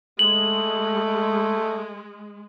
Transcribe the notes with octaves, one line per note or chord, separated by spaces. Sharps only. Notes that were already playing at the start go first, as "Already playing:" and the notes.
G#3 A3 F#7